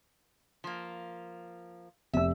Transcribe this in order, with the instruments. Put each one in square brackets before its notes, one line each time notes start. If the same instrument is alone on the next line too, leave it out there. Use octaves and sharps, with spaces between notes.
[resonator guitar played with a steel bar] F3 A#3
[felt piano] F1 E6 [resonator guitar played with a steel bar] E5